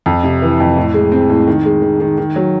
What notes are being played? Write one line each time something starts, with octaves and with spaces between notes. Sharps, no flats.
F2
C3
E3
F2
A2
G#3
C4
A2
D#3
G#3
D#3
D#3
D#3
F#3